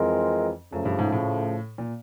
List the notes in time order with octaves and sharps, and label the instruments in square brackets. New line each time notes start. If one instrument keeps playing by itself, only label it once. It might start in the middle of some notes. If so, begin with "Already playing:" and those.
Already playing: [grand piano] F2 [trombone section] E3 G#3 C4 F4 A#4
[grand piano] F#2 [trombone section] C#3 F3 A3
[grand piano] G2
G#2
A2
A#2